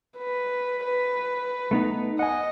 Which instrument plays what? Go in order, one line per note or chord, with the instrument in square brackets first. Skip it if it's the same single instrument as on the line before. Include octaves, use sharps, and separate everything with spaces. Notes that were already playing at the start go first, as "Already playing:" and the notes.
[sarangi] B4
B4
[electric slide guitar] A3 B3 D#4
[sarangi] D#5 [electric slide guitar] F#5 G#5